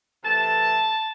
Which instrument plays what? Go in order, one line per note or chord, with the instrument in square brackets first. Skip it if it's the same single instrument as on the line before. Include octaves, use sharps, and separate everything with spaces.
[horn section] C3 E3 A3 A5